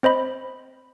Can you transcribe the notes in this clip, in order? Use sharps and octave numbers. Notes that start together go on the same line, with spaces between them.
C4 C5 D#5 B5